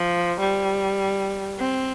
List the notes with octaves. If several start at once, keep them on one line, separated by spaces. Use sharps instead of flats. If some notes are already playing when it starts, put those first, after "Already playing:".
Already playing: F3
G3
C4